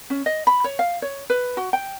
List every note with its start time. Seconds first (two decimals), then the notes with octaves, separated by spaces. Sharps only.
0.10 C#4
0.26 D#5
0.47 B5
0.64 C#5
0.79 F5
1.02 C#5
1.30 B4
1.57 F#4
1.73 G5